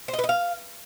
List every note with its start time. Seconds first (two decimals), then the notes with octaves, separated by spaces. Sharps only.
0.08 C5
0.13 D#5
0.19 B4
0.24 D#5
0.29 F5